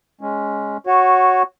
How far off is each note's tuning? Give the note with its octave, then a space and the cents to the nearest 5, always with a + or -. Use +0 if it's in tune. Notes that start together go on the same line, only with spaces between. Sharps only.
G#3 +5 C#4 +0
F#4 +0 C#5 -10